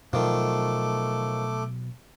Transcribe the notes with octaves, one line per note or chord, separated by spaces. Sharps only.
B2 D#3 F3 F#3 A3 D6